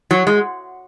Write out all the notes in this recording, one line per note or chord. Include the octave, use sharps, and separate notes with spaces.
F#3
G#3